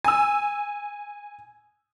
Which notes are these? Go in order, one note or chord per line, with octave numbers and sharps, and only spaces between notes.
G#5 E6